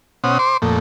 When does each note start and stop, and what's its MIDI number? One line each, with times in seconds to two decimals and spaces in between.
0.24 0.38 47
0.24 0.38 61
0.24 0.38 72
0.24 0.38 78
0.24 0.38 87
0.39 0.57 72
0.39 0.57 84
0.39 0.57 86
0.62 0.79 41
0.62 0.79 46
0.62 0.79 57